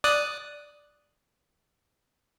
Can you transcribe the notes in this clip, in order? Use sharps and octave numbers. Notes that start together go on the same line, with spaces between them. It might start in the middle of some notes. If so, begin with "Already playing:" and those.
D5 D#6 F#6